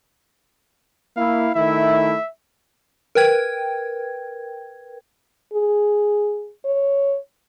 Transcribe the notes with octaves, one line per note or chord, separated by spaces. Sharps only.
A#3 E4 F5
D#3 A3 E4 E5
A#4 B4 G5 G#6
G#4
C#5